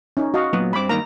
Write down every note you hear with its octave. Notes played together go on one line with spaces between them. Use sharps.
C#4 D#4
F#4 D#5 F5
A#2 F#3 B3
G2 C4 B5 D6
G2 D#3 A#3 A#5